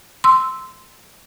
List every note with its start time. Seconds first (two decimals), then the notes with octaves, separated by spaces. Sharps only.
0.24 C6 E6